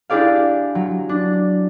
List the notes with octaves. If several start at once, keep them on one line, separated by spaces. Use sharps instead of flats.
D4 E4 G4 G#4 D5 F5
F#3
D4